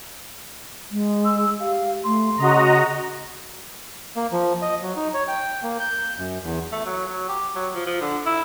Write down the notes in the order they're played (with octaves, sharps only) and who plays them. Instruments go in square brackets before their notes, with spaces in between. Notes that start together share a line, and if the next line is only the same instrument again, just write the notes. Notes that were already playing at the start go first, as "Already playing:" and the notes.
[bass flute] G#3
[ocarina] E6
[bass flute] G4 [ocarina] F5
[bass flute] A3 [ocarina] C6
[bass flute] C#3 [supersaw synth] F#4 D#5 A#5
[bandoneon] A#3
F3
D#5
F#3
D#4
C#5
G5
A#3
G6
F#2
E2
[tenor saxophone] A3
F#3
F#3
G4
F#3
F3
F3
D3
E4